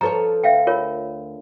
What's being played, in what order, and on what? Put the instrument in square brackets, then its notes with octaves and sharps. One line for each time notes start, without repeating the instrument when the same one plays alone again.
[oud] F3 A4 C#5 [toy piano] B4 A#5
[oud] D2 [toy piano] E5 F5 G5
[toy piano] F4 A#4 C#5